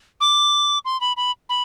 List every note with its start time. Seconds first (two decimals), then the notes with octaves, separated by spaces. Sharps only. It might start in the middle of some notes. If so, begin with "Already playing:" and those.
0.20 D6
0.85 C6
1.01 B5
1.17 B5
1.49 B5